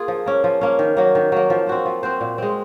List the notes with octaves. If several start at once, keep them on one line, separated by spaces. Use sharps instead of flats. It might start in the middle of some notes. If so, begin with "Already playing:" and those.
Already playing: A#3 F4 G#4
F3
A#3 C#4
F3
A#3 C#4
D#3
F#3 A#3
D#3
F#3 A#3
F3
C4 F#4 C5
F3
C4 F#4 C5
A#2
G#3 C4